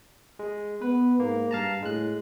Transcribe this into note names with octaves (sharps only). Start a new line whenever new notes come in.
G#3
B3 B4
G#2 A#3
G2 F5 A5 A#5
A2 G#3 F#6